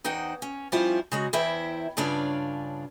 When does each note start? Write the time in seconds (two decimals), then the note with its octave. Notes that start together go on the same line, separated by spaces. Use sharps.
0.04 E2 D#4 C5 F#5 G5
0.42 C#4
0.72 F3 G3 C#4 E4 F4 C5
1.12 C#3 G#3 F#4
1.33 E2 E3 E4 C5 E5 G5
1.97 G2 C#3 D4 F4 C#5 D5